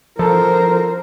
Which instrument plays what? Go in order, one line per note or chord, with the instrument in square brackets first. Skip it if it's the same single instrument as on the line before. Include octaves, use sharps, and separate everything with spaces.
[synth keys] F3 A4 [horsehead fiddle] A#4 C5